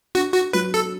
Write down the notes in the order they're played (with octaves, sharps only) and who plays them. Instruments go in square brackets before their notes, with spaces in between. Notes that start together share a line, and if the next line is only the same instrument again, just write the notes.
[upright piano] D4 [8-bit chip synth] F#4
[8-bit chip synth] F#4
[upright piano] F#3 [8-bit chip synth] B4
[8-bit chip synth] A4